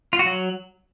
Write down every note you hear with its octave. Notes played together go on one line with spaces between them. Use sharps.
F4
F#4
F#3